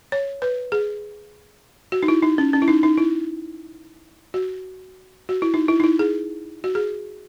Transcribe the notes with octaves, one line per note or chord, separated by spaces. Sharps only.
C#5
B4
G#4
F#4
D#4
E4
D#4
C#4
C#4
E4
D#4
D#4
E4
F#4
F#4
E4
D#4
E4
D#4
E4
G#4
F#4
G#4